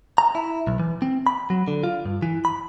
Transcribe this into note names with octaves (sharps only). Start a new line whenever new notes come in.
A#5
E4
B1
E3
C4
B5
F#3
D3
F4
G2
E3
B5